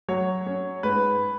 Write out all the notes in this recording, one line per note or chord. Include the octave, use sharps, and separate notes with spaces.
F#3 C#5
C#4
G#2 B4